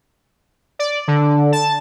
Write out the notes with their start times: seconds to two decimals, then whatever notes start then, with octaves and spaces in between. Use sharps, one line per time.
0.79 D5
1.08 D3
1.52 A5